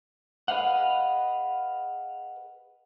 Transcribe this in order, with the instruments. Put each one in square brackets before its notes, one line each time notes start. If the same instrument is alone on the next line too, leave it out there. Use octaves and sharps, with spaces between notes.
[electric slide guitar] G#4 B4 D#5 F5 F#5